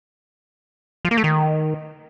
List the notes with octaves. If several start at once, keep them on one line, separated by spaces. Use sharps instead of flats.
F3
A#3
A3
D#3